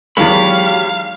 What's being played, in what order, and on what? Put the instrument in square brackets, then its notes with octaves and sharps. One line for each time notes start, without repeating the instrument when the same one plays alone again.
[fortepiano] E2 D#3 G#3 [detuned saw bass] F#3 [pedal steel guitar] G4 C#5 B5 [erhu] F5